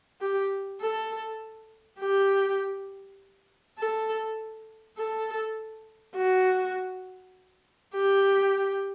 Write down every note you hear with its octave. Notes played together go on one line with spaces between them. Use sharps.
G4
A4
G4
A4
A4
F#4
G4